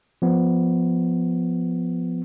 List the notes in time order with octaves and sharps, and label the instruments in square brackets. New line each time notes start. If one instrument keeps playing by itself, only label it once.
[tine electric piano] F3 B3